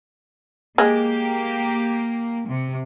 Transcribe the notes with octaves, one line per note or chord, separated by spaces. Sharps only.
G#3 A#3 G4
C3